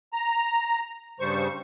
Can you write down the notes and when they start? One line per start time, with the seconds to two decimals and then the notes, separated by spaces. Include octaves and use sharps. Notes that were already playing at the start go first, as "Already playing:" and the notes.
0.13 A#5
1.20 G2 C#3 G3 C5 C#6